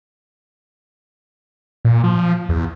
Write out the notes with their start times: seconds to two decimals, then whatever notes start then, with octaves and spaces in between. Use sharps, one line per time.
1.85 A#2
2.04 F3
2.49 E2